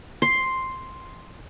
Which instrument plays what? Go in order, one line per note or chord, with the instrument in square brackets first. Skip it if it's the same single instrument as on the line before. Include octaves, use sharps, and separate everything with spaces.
[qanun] C6